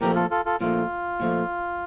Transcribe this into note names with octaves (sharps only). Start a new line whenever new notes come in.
A#2 F3 A3 G4 A#4
F4 A4
F4 A4
F4 A4
A#2 F3 A3 F4
A#2 F3 A3